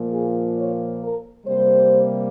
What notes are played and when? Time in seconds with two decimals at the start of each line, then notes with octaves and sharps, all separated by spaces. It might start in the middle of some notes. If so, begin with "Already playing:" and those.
Already playing: A#2 F3 A#3
0.11 G#4
0.57 C#5
1.01 A#4
1.46 C3 G3 A#3 C5